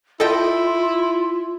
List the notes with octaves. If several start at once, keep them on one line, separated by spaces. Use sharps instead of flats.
E4 F4 A4 D#5 G5